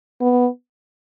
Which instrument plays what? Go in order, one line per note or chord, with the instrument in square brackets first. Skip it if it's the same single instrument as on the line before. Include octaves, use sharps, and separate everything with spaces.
[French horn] B3